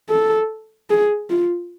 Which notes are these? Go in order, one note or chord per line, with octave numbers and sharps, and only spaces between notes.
A4
G#4
F4